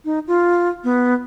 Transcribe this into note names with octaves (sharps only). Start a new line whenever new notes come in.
D#4
F4
B3